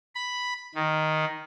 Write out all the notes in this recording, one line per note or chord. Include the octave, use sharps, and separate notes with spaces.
B5
D#3